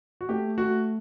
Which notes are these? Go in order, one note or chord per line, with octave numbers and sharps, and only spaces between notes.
F#4
A3 G4
A3 F#4